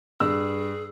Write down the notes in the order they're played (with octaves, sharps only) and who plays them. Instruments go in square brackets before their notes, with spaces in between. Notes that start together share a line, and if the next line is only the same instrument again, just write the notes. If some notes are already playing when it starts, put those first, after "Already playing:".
[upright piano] G2 E6 [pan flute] G#4